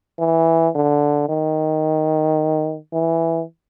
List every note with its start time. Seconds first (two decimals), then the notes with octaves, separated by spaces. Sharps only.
0.19 E3
0.75 D3
1.29 D#3
2.93 E3